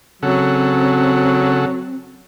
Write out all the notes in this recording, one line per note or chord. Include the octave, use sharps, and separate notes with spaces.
C#3 F#3 C4 A4 F#5